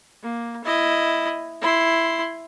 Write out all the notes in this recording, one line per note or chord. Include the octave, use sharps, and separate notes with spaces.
A#3
E4 D#5
E4 C6